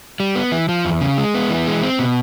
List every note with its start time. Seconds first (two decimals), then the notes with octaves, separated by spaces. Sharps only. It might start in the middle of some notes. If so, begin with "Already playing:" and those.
0.20 G3
0.35 B3
0.52 E3
0.69 F3
0.85 E2
1.01 C#3
1.18 G#3
1.35 B3
1.50 E3
1.67 G#3
1.83 C4
1.99 B2